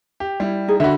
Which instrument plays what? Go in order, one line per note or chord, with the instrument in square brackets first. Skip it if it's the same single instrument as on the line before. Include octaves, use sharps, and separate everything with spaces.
[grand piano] G4
G3 E4
[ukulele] D#4 G#4
[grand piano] D3 F#4 [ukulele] E5 B5